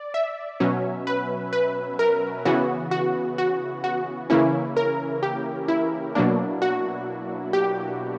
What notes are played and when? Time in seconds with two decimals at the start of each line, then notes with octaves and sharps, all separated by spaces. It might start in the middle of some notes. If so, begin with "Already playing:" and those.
Already playing: D5
0.14 E5
0.60 B2 F#3 C#4
1.07 B4
1.53 B4
1.99 A#4
2.45 C#3 E3 B3 F#4
2.91 F#4
3.38 F#4
3.84 F#4
4.30 C#3 E3 A#3 C#4 E4
4.77 A#4
5.23 G4
5.68 E4
6.15 B2 F#3 A#3 D4
6.62 F#4
7.53 G4